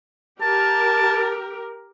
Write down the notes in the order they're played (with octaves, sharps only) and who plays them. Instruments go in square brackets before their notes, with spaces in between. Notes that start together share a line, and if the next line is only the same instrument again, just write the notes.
[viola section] G4 A#4 [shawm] A5